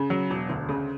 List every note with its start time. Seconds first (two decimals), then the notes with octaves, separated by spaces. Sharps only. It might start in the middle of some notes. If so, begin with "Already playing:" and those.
Already playing: C#3
0.10 F#3
0.30 E1
0.49 D2
0.69 C#3